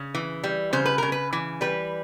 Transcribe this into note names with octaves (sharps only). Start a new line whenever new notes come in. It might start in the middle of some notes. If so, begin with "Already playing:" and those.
Already playing: C#3
E3
G3
C#3 C5
B4
C#3 A#4
B4
E3
G3 B4